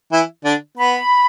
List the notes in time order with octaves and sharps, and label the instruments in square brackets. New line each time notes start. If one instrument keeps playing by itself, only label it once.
[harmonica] E3 E4
D3 D4
[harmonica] B3 [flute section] B5